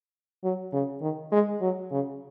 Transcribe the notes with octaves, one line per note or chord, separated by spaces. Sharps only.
F#3
C#3
D#3
G#3
F#3
C#3